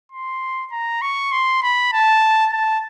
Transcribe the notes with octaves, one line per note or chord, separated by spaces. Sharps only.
C6
A#5
C#6
C6
B5
A5
A5